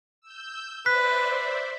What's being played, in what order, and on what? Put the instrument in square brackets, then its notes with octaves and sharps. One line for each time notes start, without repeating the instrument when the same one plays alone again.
[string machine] E6 G6
[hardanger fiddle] B4 [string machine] C5 D5 E5 [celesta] F#6 [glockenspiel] B6